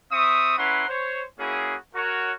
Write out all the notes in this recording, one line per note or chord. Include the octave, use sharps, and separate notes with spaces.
C4 E5 C#6 D#6
C#4 E4 B4 F#5 A#5 C6
C5 C#5
A#3 C#4 E4 F#4 G#4
F#4 A#4 C#5